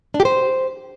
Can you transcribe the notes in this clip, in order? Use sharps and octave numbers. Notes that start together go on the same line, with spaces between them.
D4
G4
C5